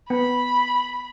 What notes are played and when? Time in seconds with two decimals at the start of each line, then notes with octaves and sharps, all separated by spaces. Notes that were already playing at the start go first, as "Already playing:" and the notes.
0.10 B3 B5